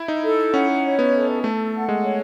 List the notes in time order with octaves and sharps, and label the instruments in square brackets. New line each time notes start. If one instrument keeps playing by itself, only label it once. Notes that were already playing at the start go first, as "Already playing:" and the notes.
Already playing: [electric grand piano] E4
D#4
[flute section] A4
[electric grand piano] C#4 [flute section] F#5
[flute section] C#5
[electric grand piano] B3
[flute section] A4
[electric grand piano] A3 [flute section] A4
[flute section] F#5
[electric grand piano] G#3
[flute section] C#5